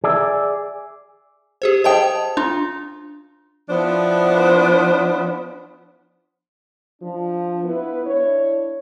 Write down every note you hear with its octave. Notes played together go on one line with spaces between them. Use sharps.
G#4 D5 E5
G4 G#4 C5
C5 D#5 G5 A5 D#6
D4 F4
F3 B3 D4 E4 C5
F3 D4
B3 E4 B4
D4 E4 C#5